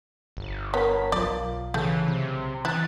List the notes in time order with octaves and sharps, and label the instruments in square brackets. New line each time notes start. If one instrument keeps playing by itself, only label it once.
[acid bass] G1
[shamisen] B3 [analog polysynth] A#4 C#5 B6
[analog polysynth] B1 [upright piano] F4 A#4 D6 [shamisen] D5
[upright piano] C#3 [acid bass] E3 [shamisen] A3
[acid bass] C3
[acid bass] E3 [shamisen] E4 [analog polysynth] F#6 A6